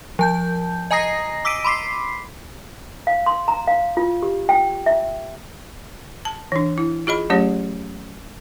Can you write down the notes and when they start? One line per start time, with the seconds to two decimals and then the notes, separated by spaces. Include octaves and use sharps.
0.19 F3 A5 G6
0.91 D#5 G#5 A#5 D#6 A#6 C7
1.45 D6 E6 B6 D7 D#7
1.64 B5 C6 D6 B6 C7
3.07 F5
3.26 C6
3.48 A#5
3.67 F5
3.97 F4
4.23 G4
4.49 G5
4.86 E5
6.25 A5
6.52 E3 D4
6.78 E4
7.07 F4 G#4 D#5 B5
7.30 F#3 A3 C#4 G4 C#5